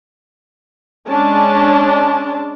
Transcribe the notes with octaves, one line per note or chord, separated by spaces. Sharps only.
G#3 C#4 D4 A5